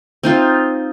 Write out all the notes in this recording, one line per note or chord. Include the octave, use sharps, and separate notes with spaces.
C4 D#4 F4